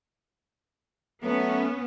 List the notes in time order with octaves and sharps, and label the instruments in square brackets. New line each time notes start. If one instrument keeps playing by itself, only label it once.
[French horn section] F#3 A3 [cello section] B3 C#4